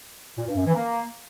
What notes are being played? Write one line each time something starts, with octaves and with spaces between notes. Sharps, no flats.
A#2
G2
F#2
E3
A#3